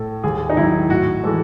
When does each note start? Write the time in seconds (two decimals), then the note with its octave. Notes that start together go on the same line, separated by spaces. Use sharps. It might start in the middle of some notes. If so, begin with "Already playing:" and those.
Already playing: A2 A4
0.24 D#2 G#4
0.50 D#4
0.57 D#3 F#3 E4
0.90 A2 F#4
1.24 E3 G#3 A4